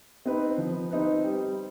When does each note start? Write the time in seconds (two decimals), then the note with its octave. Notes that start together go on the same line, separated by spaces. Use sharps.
0.26 C4 D#4 B4
0.58 F3
0.91 C4 D#4 B4
1.24 G3